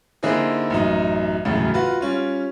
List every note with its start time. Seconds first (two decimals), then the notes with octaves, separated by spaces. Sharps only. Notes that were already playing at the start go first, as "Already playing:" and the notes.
0.23 D3 A#3 C4 D#4 E4 G#4
0.70 A1 F#2 D#4
1.45 E1 C2 F#2 A2 C#3
1.74 F4 F#4 B4
2.01 G3 C#4 F4